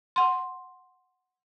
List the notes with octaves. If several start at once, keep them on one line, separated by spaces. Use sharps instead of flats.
F#5 C6